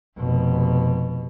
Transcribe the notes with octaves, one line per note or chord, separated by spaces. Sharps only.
F1 B2